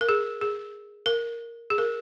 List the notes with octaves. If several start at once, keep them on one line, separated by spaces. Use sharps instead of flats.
A#4
G#4
G#4
A#4
G#4
A#4